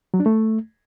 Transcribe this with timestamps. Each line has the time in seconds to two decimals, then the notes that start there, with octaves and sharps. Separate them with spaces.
0.14 F#3
0.20 D4
0.26 A3